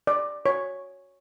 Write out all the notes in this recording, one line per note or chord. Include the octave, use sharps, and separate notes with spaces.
D5
C#5